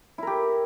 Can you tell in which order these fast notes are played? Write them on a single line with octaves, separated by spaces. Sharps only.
E4 A#4 G4